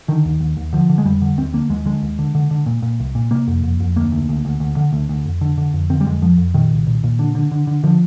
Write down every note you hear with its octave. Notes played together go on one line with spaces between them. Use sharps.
D3 D#3
D#2
D#2
D#2
D3 F3
D3
G#3
F2 G3
D3
D#2 C4
D3 A#3
D#2 G#3
D3 G#3
D#2
D3
D3
D3
A#2
A#2
C2
A#2
C3 A#3
F2
F2
F2
D2 A#3
D2
D2
D2
D2
D3
D2
D2
F2
D3
D3
F2
D3 C4
G3
F2 G#3
F2 F3
F2
A#2 D#3
C2
A#2
A#2
D3
D3
D3
D3
D3 F3